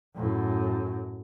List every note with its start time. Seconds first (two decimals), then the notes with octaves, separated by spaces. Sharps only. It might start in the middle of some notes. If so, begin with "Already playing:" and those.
0.16 F#2 A2